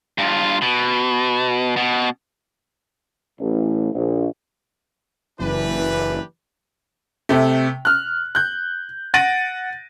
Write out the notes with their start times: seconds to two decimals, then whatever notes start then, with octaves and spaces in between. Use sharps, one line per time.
0.18 G2 F4
0.62 B2
1.76 B2
3.39 A1
3.94 A#1
5.40 F#1 E3 D4 G4 B4
7.29 C3 A3
7.85 F6 F#6
8.35 F#6 G6
9.14 F#5 A6 A#6 D7 D#7 F#7